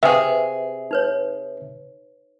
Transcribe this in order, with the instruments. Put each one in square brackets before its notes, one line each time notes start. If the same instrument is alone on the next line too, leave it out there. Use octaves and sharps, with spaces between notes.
[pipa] C3 G#4 [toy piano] G4 B4 F5 [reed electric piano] E5
[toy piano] D#4 B4 C#5